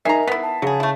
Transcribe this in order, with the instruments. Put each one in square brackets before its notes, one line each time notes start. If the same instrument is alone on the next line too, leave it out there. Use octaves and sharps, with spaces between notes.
[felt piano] D#4 G#5 C7 [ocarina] A#4 [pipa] E5 A#5
[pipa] B3 E4 [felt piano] B6
[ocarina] A5
[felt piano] C#3 [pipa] F#3 G#4
[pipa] A3 E4